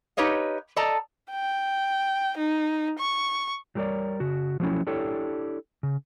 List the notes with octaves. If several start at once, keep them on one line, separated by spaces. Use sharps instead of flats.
D#4 G4 B4 C#5 D#5 F5
A4 D5 D#5 A5 A#5
G5
D#4
C#6
F#3 G3 G4 A#4 C#5 D5
C#3 F#4
F3 F#3 A3 B3 C#4 E4
D4 E4 G4 A4 C#5
C#3